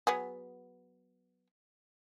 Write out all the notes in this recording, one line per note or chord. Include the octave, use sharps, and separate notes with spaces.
F#3 B3 G#4